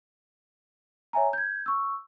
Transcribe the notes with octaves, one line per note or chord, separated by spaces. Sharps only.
C#5 E5 G#5 A#5
G6 G#6
C#6 E6